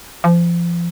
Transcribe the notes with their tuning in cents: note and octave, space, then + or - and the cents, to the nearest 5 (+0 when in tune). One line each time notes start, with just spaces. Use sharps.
F3 -30